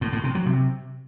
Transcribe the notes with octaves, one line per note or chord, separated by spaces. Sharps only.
A2
A2
C3
F#3
C3